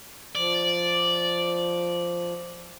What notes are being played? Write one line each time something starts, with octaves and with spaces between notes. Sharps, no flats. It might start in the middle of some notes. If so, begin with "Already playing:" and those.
F3 D5